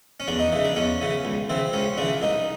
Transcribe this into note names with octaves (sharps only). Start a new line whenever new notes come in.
C#4
E2 D4
D#4
C#3 E3
D4
E2 C#4
C#3 E3
C#2
C#3 E3 C4
C#2 C#4
C#3 E3 D4
C2 D#4